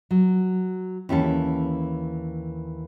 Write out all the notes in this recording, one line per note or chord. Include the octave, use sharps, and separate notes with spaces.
F#3
D#2 E3 C#4 A4